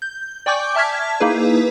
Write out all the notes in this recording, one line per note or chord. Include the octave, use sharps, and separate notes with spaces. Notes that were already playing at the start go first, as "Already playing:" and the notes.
G6
D5 G5 G#5 C#6 D6 G6
E5 A5 F6 G#6 B6
A#3 D#4 E4 G#4 B4